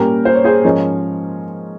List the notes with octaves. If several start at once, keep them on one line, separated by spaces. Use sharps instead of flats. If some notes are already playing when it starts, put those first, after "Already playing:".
Already playing: A#2 G3 A#3 C#4 G4 A#4
C5
C#5
G#4 C5
G#2 F3 G#3 C#4 A#4 C#5